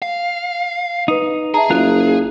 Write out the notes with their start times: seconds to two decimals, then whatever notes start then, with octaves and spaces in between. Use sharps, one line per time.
0.02 F5
1.08 D#4 B4 D#6
1.54 G#4 E5 A5 A#5
1.71 F#1 F4 A#4 F#6